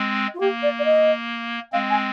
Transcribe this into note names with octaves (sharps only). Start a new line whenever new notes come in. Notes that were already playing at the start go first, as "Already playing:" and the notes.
Already playing: G#3 C4
F4
A#3 G4
D5
D5
D#5
G#3 C4 F5
G#5